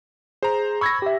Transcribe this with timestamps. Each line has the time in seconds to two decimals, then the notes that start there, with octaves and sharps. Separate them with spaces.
0.43 G#4 C5 A#5
0.81 B5 C#6 E6 G#6 A#6
1.02 G4 E5